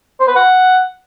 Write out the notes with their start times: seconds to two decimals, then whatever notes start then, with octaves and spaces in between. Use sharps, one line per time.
0.20 C5
0.28 B4
0.36 F#5